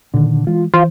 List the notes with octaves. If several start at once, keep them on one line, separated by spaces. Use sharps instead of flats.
A#2 D3 D#3
E3 G#3 F4
E3 F4 C5